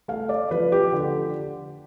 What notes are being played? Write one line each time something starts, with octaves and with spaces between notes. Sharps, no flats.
A3 F5
D5
F3 B4
G4
D3